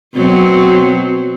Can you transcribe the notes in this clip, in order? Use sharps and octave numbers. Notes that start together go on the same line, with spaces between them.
B2 F#3 C4